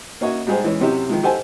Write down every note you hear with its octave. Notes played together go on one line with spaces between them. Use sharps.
A#3 C#4 F#4 C#5 D#5 E5
G#2 G3 G4 G#4 C5
E3 G#3 C#4
F#2 C3 C#4 E4 G4 E5
D#3 F3 G#3
G4 A4 C5 F#5 G#5 A5